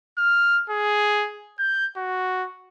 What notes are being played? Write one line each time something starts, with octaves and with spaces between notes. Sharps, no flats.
F6
G#4
G6
F#4